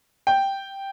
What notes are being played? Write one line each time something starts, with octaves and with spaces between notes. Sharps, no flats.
G5